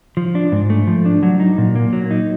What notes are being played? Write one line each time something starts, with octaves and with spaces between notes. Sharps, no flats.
F3
D4
G#2
A3
F3
D4
F#3
D#4
A#2
A#3
F#3
D#4